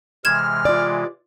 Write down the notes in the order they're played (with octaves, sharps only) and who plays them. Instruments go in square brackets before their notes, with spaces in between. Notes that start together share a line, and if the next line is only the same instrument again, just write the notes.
[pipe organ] C3 E3 G#3 [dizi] F6 [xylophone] G#6 E7
[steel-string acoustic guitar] F4 D5